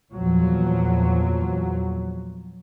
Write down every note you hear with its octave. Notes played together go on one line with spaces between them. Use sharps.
E2 A#2 F3 F#3